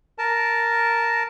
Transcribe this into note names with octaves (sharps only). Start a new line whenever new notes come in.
A#4 A5